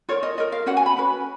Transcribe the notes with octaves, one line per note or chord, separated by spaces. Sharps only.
F4 A#4 C#5
D#5
F4 A#4 D#5
F5
C#4 F#4 B4 F#5
G#5
B5
C#4 F#4 B4